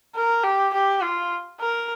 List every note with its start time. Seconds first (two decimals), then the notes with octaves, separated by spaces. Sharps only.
0.15 A#4
0.44 G4
0.74 G4
1.02 F4
1.60 A#4